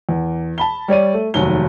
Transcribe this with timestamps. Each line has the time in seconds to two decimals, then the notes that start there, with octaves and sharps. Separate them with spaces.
0.09 E2
0.58 A5 B5 G7
0.88 G3 C#5 D5 D#7
1.14 A3
1.34 F1 D#2 F#3 G7